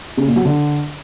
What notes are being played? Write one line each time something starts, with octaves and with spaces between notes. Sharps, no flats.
C#3
A#2
F#3
D3